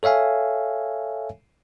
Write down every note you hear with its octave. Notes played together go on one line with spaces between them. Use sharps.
A4 C#5 E5 F5 G#5